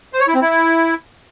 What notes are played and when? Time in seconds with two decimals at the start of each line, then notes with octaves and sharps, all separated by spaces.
0.13 C5
0.20 C#5
0.27 E4
0.35 C4
0.42 E4